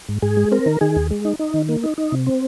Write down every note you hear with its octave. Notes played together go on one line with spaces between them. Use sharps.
G#2
G#2 G#4
G#3
C4 A#4
D#3
D#3 G#4
D#2
G#3
D#4
D#4
D#3
A#3
D#4
D#4
C3
C4